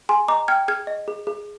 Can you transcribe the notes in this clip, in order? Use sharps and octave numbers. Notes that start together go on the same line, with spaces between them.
G#4 G#5 C6
D#5 A#5 D6
G5 F6 G#6
G#4 F6 G#6
D#5
G#4
G#4